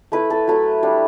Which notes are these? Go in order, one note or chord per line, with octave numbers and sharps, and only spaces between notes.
A3 E4 B4
A4
F#3 A3 E4
G3 D4